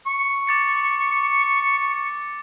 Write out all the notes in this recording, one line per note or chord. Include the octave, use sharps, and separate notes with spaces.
C#6
D6 A6 C#7